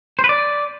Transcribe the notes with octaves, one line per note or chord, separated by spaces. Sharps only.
C5
B4
D5